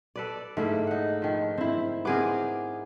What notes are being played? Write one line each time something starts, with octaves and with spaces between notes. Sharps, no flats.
A4 B4 D5
G#2 A3 A#3 E4
D#4 F#5
D#3 F3
C4 E4
B3 C4 G#4 A#4 D6